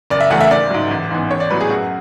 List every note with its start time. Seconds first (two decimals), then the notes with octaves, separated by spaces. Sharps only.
0.10 F#1 D5
0.21 E5
0.30 F#2 E3 A3 F#5
0.41 E5
0.51 G#1 D5
0.70 G#2 F#3
0.91 A1
1.11 G#2 E3 B3
1.30 A1 C#5
1.40 D5
1.50 A2 F#3 B3 B4
1.60 G#4
1.70 F#2 F#4